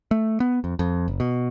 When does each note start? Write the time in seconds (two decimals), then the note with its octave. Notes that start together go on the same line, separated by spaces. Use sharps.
0.11 A3
0.40 B3
0.64 F2
0.79 F2
1.08 F#1
1.20 B2